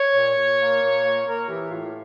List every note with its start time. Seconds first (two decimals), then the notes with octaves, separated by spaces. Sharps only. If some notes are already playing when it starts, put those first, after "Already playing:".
Already playing: C#5
0.14 A#2
0.36 A#2
0.59 A#3
0.81 A#2
1.03 A#3
1.25 A#3 A#4
1.48 E3 G4
1.70 A2 F4